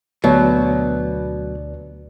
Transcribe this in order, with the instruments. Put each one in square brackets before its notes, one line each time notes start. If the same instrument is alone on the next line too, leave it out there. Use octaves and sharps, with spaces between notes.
[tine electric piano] D2 D5 [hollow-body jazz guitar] B2 F#3